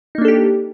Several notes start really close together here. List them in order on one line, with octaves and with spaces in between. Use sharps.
D#4 A#3 D4 A4 G4